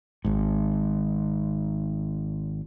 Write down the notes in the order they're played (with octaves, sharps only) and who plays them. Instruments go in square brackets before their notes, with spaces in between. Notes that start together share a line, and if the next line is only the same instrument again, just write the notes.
[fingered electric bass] G#1 G#2